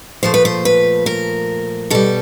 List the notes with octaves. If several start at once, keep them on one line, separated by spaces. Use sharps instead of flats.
A#2 F3 A3 C5
B4
C5
B4
A#4
B2 G3 A4